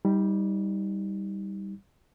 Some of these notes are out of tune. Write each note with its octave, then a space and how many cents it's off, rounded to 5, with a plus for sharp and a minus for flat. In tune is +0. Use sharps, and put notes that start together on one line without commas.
G3 +0 D#4 +25